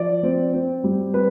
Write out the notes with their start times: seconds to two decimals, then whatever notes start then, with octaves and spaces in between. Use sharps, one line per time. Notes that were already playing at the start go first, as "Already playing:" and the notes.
Already playing: F3 D5
0.23 C4
0.54 C4
0.84 G3
1.14 C4 B4